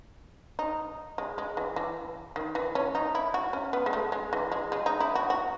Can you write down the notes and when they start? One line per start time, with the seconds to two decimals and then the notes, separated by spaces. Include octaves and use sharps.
0.59 D#4
1.18 G#3
1.38 G#3
1.57 E3
1.76 E3
2.36 D#3
2.55 E3
2.75 C#4
2.95 D#4
3.15 E4
3.34 F#4
3.53 C#4
3.73 B3
3.86 G#3
3.93 A3
4.12 G#3
4.33 E3
4.52 G#3
4.72 G#3
4.86 D#4
5.00 E4
5.15 F#4
5.30 F#4